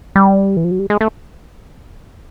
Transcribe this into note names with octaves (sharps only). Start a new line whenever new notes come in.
G3
E3
F3
F#3
G3
G#3
A3